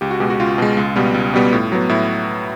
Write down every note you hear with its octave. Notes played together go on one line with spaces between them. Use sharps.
C#2 G4
F#4
B2 G#3 G4
F#4
C#2 F4
B2 G#3
C#2
B2 G3 B3
C#2
B2 G3 B3
A2
F#3 B3
A2 E4